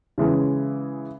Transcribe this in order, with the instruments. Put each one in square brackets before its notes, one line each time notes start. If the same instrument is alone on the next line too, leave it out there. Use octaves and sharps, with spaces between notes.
[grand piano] C#3 E3 G#3